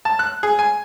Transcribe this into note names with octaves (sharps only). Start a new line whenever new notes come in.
A5
F#6
G#4
G#5